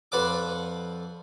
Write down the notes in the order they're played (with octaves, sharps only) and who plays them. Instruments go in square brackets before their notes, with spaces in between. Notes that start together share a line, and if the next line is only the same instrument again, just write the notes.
[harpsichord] F2 B4 D5 F#5 A5 D6